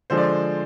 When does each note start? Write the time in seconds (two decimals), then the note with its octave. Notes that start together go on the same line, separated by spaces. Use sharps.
0.10 D3 F3 G#3 C5
0.17 D5